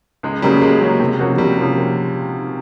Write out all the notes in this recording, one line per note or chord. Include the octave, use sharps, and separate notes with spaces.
C#2 G#3
C#3 F#3 G3 A#3 C#4
C#2 G#3
C#3 F#3 A#3 C#4
C3
F3 A#3 C#4 F#4
C3 G3
F3 A#3 C#4 F#4